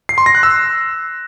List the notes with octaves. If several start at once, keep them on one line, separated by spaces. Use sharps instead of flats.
C7
C6
A#6
F#6
E6